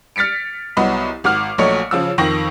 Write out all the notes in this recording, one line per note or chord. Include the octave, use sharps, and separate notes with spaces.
F6 A6 B6 C#7 D7
C2 F#3 B3 D#5 B5
G#1 F#4 D6 F6
A#1 F#3 A3 C#5 D#5 C#7
C#3 F3 E6
F2 D#3 G5 C#6 A#6 F#7